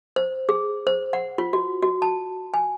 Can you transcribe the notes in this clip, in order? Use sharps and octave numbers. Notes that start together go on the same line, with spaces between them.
C5
G#4
C5
F#5
F4
F#4
F#4
A5
G#5